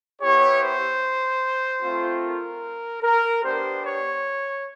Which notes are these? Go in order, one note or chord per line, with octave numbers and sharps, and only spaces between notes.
B3 E4 G4 C#5
C5
A3 C4 F4
A#4
A#4
B3 D4 G4 C5
C#5